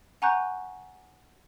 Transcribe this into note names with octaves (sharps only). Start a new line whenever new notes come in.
F#5 G#5 A#5 C#6 F#6 G6